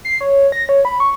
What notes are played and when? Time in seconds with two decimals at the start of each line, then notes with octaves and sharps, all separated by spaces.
0.05 C7
0.21 C#5
0.52 A#6
0.69 C#5
0.85 B5
1.00 C#6